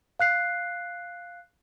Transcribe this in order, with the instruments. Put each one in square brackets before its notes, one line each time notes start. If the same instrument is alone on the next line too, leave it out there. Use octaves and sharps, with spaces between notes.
[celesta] F5 F#6 C7